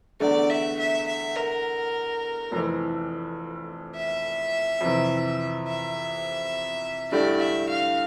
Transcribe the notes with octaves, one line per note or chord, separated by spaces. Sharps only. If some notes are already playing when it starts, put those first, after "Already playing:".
E2 D3 A3 D5
E5
E5
E5
A#4
F1 F2 E3
E5
F2 C3 E3
E5
G2 D3 A3 E4 G4 D5
E5
F5